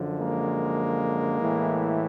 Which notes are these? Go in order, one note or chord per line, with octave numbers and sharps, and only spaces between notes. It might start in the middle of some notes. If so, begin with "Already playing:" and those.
Already playing: F#2 D3 F3
G#3 A#3
A2 E3